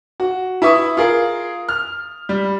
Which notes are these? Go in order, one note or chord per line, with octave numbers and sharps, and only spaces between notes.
F#4
E4 B4 E5 C#6 D#6
F4 G#4 A#4
F6
G3